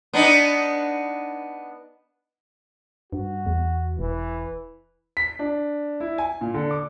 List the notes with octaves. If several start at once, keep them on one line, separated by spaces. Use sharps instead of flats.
B3 D4 D#4
G2 F#4
E2
E1 E3
B6
D4
E4
G#5
A#2
D3
D6